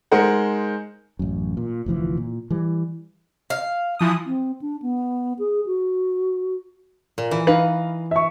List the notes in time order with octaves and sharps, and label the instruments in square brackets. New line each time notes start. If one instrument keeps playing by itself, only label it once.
[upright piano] G#3 D#4 G#4 A#4 C5 F#5
[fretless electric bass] A1 F#2
A#2
F1 D2 E3 F3
A#2
E3 G3
[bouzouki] F5
[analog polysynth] E3 F3 D#6
[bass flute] C4
D4
B3
G#4
F#4
[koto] A#2
E3
[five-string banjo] D#4 B4 [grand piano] F5
[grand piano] E5 C#6